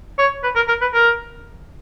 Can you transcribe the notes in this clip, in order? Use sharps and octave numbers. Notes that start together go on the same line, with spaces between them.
C#5
B4
A#4
A#4
B4
A#4